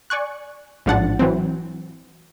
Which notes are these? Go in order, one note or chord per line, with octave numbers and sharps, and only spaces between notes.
D5 G#5 C#6 F#6
A1 G#2 F3 D4 F#5 A6
E3 F#3 C4